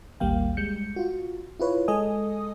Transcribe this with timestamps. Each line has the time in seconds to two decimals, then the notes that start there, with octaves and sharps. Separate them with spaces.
0.20 A1 D#2 G3 A#3 F5 G5
0.57 G3 G#3 G6 C#7
0.96 F4 F#4
1.60 E4 F4 B4 C#5
1.88 G#3 A4 D#5 G#5 D#6